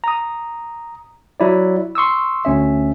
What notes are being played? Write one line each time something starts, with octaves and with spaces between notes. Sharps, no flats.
A#5 D#6
F#3 E4 D5
C6 C#6 D#6 E6
D2 C#4 E5